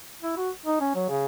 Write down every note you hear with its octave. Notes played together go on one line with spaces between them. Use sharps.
E4
F#4
D#4
C#4
F#3
C#3